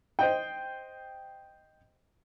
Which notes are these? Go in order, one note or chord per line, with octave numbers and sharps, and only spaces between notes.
C5 D#5 G5